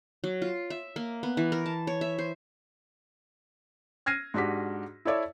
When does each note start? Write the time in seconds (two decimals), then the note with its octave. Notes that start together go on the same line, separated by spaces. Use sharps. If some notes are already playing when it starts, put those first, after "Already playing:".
0.24 F#3
0.42 F4
0.70 E5
0.96 A#3
1.23 B3
1.37 E3
1.52 A#4
1.66 A5
1.87 C#5
2.01 E5
2.18 C5
4.06 F6 G#6 A#6 C7 D#7
4.34 G#2 D4 F#4 G4 B6
5.05 E4 A4 C#5 D5 E5